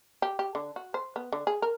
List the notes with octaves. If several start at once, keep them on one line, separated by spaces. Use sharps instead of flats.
G4
G4
D3
F#4
C5
B3
D3
G#4
A#4